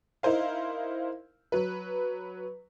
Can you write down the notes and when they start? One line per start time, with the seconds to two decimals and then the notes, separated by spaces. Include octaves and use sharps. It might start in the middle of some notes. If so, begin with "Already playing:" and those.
0.23 D#4 E4 A#4 C5 F5
1.52 F#3 B4